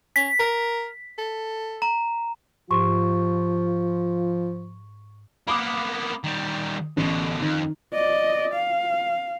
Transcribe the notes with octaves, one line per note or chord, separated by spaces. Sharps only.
C#4 B6
A#4
A4
A#5
G#2 F3 F4 G4 C6 C#6
A#3 B3 B5 D6 D#6
D#3 G3
A1 B2 D3
F2 D#3
D5 D#5
F5